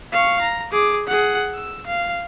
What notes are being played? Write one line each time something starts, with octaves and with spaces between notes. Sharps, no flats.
F5 C#6
A#5
G#4 D6
G#4 F#5
E6
F5